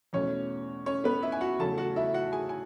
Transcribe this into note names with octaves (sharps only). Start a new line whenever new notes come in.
E2 B2 A3 C#4 C#5
C#4 C#5
B3 B4
E4 E5
G#5
F#4 F#5
E2 C#3 F#3 A3 A4 A5
F#4 F#5
E4 E5
F#4 F#5
G#4 G#5
G#5